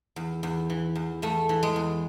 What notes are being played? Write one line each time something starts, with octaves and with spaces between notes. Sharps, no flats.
E2
E2
E3
E2
E2 A3
E3
G#3
E2